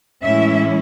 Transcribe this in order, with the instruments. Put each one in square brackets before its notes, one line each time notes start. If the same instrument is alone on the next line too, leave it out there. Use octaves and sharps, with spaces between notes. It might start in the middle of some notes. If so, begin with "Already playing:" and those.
[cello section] A2 E3 G#3 C#4 E4 E5